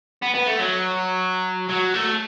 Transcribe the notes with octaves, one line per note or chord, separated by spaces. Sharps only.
B3
B3
A3
F#3
F#3
A3